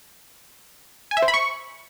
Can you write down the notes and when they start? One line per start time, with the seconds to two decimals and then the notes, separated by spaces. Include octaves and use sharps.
1.11 G#5
1.17 E5
1.22 C5
1.28 B5
1.34 C#6